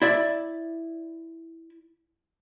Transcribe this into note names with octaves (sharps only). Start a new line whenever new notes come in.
E4 D5 E5